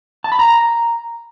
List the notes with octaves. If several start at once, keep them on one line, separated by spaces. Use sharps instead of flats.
A5
B5
A#5